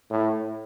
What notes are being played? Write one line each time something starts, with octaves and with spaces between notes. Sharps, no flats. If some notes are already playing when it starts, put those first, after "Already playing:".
A2